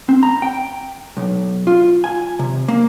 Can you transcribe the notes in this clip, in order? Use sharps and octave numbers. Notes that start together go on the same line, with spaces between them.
C4
A#5
G5
B1
F4
G#5
C3
A#3